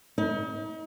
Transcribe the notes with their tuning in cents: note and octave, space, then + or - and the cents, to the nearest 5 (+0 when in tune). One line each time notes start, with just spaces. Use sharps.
D#4 +40